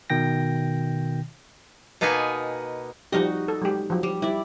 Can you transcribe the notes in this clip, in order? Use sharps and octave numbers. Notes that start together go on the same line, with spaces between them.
B2 D#3 G5 A#6
B2 A#3 B3 D#4 B4 G#5
F3 G3 D#4 F#4 G4 D#5
A4
F#3 G#3 G4
F3 F#3
G3
G3 E4 D5